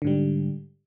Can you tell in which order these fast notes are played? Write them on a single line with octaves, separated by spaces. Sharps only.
D3 G#2 G3